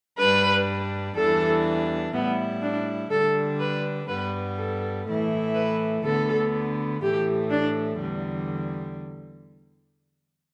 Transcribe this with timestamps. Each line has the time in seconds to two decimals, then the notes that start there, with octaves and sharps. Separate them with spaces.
0.18 G2 G3 D4 B4
1.16 E2 E3 G3 D4 A4
2.13 A2 G3 B3 E4
2.62 D4
3.10 D3 G3 D4 A4
3.60 B4
4.08 G2 G3 B3 B4
4.57 A4
5.06 A2 E3 A3 E4
5.55 B4
6.04 D2 D3 B3 A4
7.01 A2 E3 A3 G4
7.50 D4
7.99 E2 D3 G3